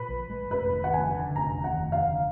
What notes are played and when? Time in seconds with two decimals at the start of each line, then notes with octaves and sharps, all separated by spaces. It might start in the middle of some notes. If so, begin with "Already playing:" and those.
Already playing: A#2 B4
0.08 A#1
0.30 G#3
0.50 F1 B4
0.72 D#2
0.84 F#5
0.93 F1 G#5
1.14 D3
1.35 F1 A#5
1.56 D#2
1.64 F#5
1.78 F1
1.92 F5
1.98 D3